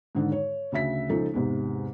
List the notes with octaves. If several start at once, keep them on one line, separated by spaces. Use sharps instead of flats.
G#2 D3 D#3
C#5
D2 C#3 E5 B6
C#2 F3 D#4 A4
E2 G#2 C3